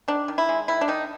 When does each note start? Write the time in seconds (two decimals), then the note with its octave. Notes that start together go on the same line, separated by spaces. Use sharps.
0.08 D#3 D4
0.28 D#3
0.38 E4
0.49 G#3
0.68 D#3 E4
0.81 D4
0.88 D#3 D#4